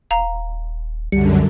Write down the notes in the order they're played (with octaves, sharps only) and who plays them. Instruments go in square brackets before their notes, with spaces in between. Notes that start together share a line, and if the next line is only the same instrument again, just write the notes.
[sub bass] D#1 [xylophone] F5 A#5
[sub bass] C2 [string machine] F#2 D3 [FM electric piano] G3 [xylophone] C#7